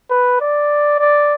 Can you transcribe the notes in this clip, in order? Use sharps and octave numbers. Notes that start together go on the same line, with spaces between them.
B4
D5
D5